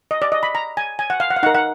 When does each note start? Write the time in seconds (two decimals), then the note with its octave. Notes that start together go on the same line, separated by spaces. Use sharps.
0.11 D#5
0.22 D5
0.32 D#5
0.43 B5
0.55 A#5
0.77 G#5
0.99 G#5
1.10 F#5
1.20 F5
1.30 F#5
1.37 F5
1.43 D#4 F#5
1.46 A#4
1.55 F#5